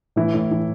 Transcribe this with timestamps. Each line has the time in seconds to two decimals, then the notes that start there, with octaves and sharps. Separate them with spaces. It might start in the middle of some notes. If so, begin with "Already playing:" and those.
0.16 A2 E3 E4
0.34 A2
0.51 E3